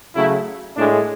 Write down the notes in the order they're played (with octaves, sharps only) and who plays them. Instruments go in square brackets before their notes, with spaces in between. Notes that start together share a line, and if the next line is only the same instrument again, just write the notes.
[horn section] C#3 F#3 A3 E4
A2 G#3 D4